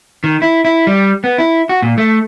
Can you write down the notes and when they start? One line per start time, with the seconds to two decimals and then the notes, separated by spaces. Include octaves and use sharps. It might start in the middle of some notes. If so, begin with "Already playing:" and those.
0.24 D#3
0.42 E4
0.65 E4
0.87 G3
1.24 B3
1.38 E4
1.69 F#4
1.82 A#2
1.98 A3